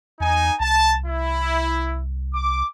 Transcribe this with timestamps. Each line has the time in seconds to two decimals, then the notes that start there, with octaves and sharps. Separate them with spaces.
0.20 E2 D#4 G#5
0.60 C2 A5
1.07 E4
2.34 D6